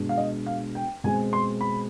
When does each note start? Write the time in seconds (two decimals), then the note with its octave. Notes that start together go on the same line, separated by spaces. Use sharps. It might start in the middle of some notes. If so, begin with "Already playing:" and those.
Already playing: B2 G#3 D4
0.09 F5
0.18 D#5
0.46 F5
0.75 G5
1.04 B2 G#3 C4 G#5
1.33 C6
1.61 B5